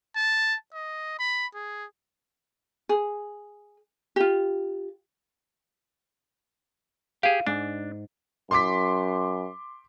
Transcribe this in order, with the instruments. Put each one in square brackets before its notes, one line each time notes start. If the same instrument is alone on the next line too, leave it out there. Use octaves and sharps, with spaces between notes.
[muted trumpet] A5
D#5
B5
G#4
[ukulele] G#4
F4 G4
[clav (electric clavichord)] G4 G#4 [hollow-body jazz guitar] F5
[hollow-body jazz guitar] G#2 [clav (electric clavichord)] D4
[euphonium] F#2 [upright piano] C6 D6 B6